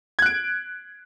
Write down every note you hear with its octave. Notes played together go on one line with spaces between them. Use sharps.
F#6 G#6 D7